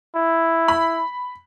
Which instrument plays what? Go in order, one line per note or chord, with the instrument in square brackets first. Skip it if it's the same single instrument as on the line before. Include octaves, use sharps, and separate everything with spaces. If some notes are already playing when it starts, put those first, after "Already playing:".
[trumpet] E4
[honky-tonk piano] B5